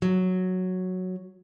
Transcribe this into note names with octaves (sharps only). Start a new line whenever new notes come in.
F#3